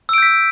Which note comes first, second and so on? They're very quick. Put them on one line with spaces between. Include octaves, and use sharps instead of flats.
E6 D7 G6 B6